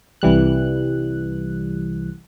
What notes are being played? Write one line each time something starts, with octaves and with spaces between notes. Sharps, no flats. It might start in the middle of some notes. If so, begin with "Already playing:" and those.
C2 E3 G3 F#6